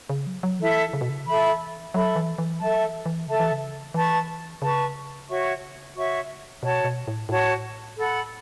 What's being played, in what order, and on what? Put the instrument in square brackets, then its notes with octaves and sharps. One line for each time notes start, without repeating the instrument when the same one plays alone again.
[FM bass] C#3
F#3
F#3
[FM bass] E3 [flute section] E4 A4 E5
[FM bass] C#3
B2
C#3
[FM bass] E3 [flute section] A4 E5 B5
[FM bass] F#3 [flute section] A4 E5 B5
[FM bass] E3
E3
[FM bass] F#3 [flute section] A4 E5 A5
[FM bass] E3
E3
[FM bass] C#3 [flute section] A4 E5 A5
[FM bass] E3
C#3
[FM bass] E3 [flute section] B4 A5 C#6
[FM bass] C#3 [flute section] B4 A5 C#6
[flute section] F#4 C#5 E5 C#6
F#4 C#5 E5 C#6
[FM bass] B2 [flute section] F#4 C#5 A5
[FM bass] B2
A2
[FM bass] A2 [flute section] F#4 C#5 A5
[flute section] A4 F#5 B5